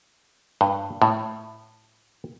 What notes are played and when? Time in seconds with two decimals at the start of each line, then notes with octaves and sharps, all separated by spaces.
0.61 G2
1.02 A2